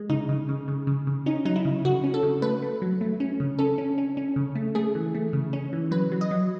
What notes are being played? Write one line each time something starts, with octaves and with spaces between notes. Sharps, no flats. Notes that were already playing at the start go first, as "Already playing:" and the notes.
Already playing: G#3
C#3 D#4
C#3
C#3
C#3
C#3
C#3
C#4 D#4
F#3 D#4
E4
C#3
C#3 F#4
C#4
A4
C#3
A3 B4
A3
F#3
A3
C#4
C#3
C#4 A4
C#4
C#4
C#4
C#3
A3
A3 G#4
E3
A3
C#3
C#4
E3
F#3 B4
F#3
D#5
F#3